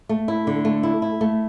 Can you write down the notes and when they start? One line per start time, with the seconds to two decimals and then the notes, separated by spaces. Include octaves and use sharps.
0.09 A3
0.28 E4
0.47 D3
0.65 A3
0.83 E4
1.02 E4
1.21 A3